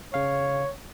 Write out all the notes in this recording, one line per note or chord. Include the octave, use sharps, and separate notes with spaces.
C#3 C#5 F5